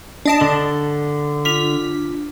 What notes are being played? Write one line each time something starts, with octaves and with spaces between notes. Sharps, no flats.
D4 D#5 A5
D3
D4 F4 B6